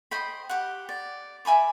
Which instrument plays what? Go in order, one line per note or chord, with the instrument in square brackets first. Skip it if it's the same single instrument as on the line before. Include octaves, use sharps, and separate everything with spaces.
[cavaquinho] C5 D#5 G5 B5
G4 F#5
D5
E5 G#5 B5 D6